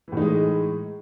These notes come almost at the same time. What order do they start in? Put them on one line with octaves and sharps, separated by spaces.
E3 A2 D#4 G#3